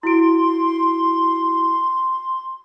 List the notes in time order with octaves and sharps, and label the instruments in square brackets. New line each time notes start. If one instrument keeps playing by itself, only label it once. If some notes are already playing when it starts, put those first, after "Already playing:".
[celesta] E4 F#4 D7 [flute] C6